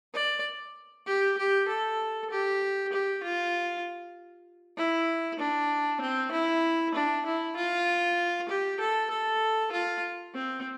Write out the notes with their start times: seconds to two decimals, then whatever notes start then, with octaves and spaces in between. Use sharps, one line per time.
0.14 D5
1.06 G4
1.38 G4
1.68 A4
2.31 G4
2.92 G4
3.23 F4
4.77 E4
5.40 D4
6.01 C4
6.32 E4
6.95 D4
7.26 E4
7.57 F4
8.49 G4
8.80 A4
9.11 A4
9.72 F4
10.34 C4